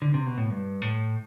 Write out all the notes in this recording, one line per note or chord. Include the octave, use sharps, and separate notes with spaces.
D3
C3
B2
A2
G2
A2